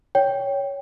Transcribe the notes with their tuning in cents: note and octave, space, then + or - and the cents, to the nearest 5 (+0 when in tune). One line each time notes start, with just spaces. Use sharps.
C#5 +10 G5 +0